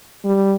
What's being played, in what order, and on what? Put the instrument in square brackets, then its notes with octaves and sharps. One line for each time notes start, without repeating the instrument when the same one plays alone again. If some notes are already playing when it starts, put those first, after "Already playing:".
[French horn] G3